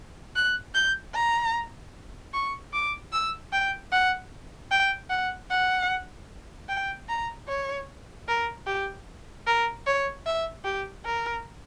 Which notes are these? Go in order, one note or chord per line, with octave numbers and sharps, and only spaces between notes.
F#6
G6
A#5
C#6
D6
E6
G5
F#5
G5
F#5
F#5
G5
A#5
C#5
A#4
G4
A#4
C#5
E5
G4
A#4